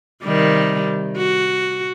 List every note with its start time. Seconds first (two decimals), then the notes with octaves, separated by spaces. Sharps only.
0.24 C3 D#3 G3
1.17 F#4